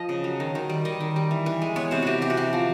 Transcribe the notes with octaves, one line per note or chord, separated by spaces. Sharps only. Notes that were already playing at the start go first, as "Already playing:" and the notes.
Already playing: F3 D#5
C#3
F#3
D#3
D#3
G3
D#3 D#5
D#3
G3
E3
E3
G#3
B3 C#5
C3 C5
E3 F#4 G4
C3 G4
F#4
C3 G4
F3